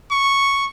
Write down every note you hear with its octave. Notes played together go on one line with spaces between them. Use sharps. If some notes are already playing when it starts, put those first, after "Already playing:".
C#6